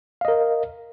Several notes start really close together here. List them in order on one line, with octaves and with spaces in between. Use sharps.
F5 D#5 A#4